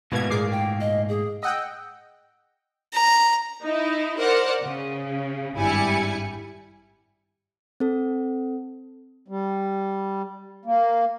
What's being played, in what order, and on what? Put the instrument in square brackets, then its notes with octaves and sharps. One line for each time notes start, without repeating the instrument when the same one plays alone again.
[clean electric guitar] G#2 A3 A#3 [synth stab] B2 G#6 [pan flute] B4
[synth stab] A#2 D6 C7 [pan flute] G#4
[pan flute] G5
D#5
G#4
[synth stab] D#5 F#5 G5 [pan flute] E6
[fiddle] A#5
[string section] D#4 E4
A#4 C5 D5 F#5
C#3
G#1 G2 G3 E4 G#5 C#7
[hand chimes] C4 A4
[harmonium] G3
A#3